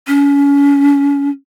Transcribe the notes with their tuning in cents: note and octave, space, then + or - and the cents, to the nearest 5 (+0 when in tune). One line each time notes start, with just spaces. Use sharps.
C#4 +30